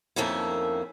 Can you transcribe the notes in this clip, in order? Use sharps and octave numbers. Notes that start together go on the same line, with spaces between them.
F2 D#3 A3 A#3 C#4 E4